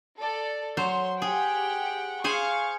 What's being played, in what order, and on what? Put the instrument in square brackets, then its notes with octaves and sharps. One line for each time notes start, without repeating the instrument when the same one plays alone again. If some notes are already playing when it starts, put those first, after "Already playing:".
[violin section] A4 D5
[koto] F#3 C5 [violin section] C#5 C6
[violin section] G4 F#5 G5 [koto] G#4
[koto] G#4 C5 G#5 [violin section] F5 C#6